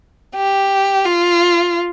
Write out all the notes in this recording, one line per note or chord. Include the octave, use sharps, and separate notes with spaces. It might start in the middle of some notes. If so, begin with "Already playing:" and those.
G4
F4